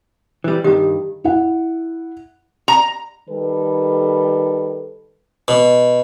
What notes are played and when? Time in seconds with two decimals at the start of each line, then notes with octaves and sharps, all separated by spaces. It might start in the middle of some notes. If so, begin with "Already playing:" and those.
0.44 E3 G3
0.64 G2 D#3 G4
1.24 E4 F#5
2.68 A#5
3.29 D#3 G3 A4 B4
5.48 B2